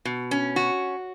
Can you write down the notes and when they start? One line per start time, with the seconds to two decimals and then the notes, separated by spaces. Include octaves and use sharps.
0.05 B2
0.31 C#4
0.56 F#4